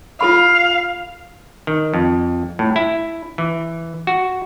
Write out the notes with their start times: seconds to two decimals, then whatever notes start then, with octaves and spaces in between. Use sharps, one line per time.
0.21 F4 A4 F5 B5
1.67 D#3
1.94 F2
2.59 A2
2.76 E4
3.38 E3
4.07 F#4